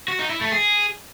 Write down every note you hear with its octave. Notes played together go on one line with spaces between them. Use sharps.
F#4
D#4
E4
A3
G#4